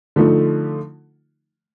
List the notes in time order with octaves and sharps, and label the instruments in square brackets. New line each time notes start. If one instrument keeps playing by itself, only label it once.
[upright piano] D3 F3 A3 D#4